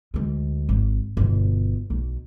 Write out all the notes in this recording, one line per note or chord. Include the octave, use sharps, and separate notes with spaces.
D2 G#3
G#1
G1 B2
B1